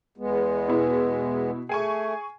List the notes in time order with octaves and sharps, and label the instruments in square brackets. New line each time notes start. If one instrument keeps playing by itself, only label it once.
[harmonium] E2 G#3 B3
[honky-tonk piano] B2 E4
[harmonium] A3 [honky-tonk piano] G#4 G#5 C#6